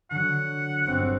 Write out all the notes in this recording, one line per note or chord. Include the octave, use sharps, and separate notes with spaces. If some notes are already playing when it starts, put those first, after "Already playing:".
D3 F#3 F#5
G1 C4